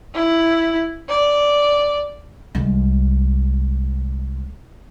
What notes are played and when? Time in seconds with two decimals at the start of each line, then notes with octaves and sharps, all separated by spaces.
0.14 E4
1.09 D5
2.55 C2 G#3